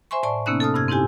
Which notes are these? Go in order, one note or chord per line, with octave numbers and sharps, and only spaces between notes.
C5 E5 G#5 C6 C#6
A2 D5 A5 C#6
C3 A#3 B3 C#4 D#4 F#6
A4 A5 D#6 F6
G2 C3 F6 G#6
C4 D#4 E4 G4 G#5